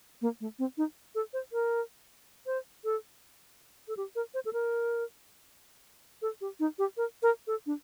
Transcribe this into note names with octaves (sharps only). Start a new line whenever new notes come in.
A#3
A3
C4
D#4
A4
C5
A#4
C5
A4
A4
G4
A#4
C5
A4
A#4
A4
G4
D#4
G4
A#4
A#4
A4
D4